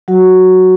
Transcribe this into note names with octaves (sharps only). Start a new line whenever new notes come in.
F#3 F#4